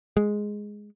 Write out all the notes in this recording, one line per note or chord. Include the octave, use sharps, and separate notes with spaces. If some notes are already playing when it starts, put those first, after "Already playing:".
G#3